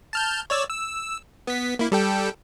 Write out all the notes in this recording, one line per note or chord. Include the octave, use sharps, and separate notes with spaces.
A5 F6 G6
C#5 D5 E6
E6
B3 B6
A#3 E4
G3 A4 G5